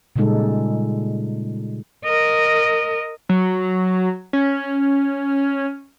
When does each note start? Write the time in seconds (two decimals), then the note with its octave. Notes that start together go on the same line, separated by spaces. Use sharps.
0.16 A#2 C#3 G3 G#3 D#4 A4
2.05 A#4 D#5
3.29 F#3
4.33 C#4